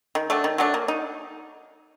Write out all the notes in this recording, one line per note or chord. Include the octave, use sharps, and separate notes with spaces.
D#3
F#3 A3 D4
D#3
F#3 A3 D4
A#3
D#4